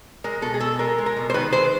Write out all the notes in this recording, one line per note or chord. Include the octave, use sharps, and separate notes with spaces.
G#3 A#4
B2 A4
G#4
B2 A4
G#3 A#4
G#3
A#4
B2
C5
D#3 B4
G#3 C5